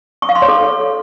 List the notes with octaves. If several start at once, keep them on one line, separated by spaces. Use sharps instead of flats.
C#6
F5
C6
C#5
A4